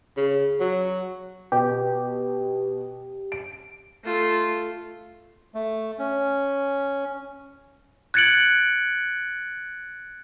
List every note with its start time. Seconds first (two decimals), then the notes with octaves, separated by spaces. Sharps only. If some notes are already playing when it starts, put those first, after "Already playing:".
0.17 C#3
0.60 F#3
1.52 B2 G4
3.32 D7
4.04 A3 F4
5.54 A3
5.99 C#4
8.14 F#6 G#6 A6 C#7 D7 F#7